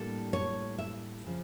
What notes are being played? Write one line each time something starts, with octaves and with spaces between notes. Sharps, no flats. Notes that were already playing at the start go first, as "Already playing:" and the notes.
Already playing: A2 G3 A#3 D4 A4
C#5
E5
C#3 F3